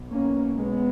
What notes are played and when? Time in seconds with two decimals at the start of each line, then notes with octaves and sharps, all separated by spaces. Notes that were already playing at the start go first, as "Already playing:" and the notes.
Already playing: B1 B2
0.12 A#3 C#4
0.55 G#3 B3